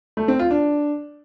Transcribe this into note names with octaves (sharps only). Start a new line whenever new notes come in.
A3
C4
F4
D4